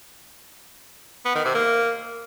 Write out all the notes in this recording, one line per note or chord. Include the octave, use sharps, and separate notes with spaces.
B3
D#3
C3
A#3